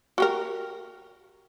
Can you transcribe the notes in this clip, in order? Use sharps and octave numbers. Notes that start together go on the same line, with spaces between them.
F#4 G4 A#4